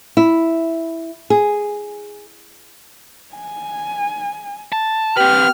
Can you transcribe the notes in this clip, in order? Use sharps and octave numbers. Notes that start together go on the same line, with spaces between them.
E4
G#4
G#5
A5
C4 G4 B4 F6